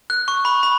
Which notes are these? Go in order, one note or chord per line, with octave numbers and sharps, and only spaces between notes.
F#6
C#6
B5
B5